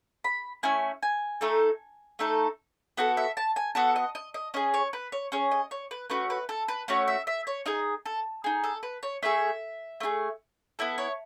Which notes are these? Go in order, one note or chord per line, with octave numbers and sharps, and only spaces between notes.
B5
A3 C#4 E4 G#5
G#5
A3 D#4 A4
A3 D#4 A4
B3 F#4 A4 F#5
E5
A5
G#5
B3 F#4 A4 F#5
D#5
D#5
D#5
C#4 G#4 D#5
C#5
B4
C#5
C#4 G#4 C#5
D#5
C#5
B4
A3 C#4 F#4 B4
B4
A4
B4
A3 C#4 F#4 C#5
E5
E5
C#5
D#4 G#4 D#5
A4
D#4 G#4
A4
B4
C#5
A3 E4 G#4 E5
A3 E4 G#4
B3 E4 A4
C#5